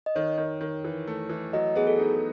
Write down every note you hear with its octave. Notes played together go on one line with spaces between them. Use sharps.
D#5
D#3 C#5
D#3
D#3
E3
A3
E3
F#3 D#5
B3 G#4
A4
D#4